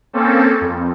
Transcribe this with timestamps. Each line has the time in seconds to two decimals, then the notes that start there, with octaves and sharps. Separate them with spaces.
0.13 A#3 C4 C#4 A4
0.61 F2